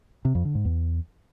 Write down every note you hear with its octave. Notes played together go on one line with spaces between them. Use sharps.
C3
F2
D3
G#2
E2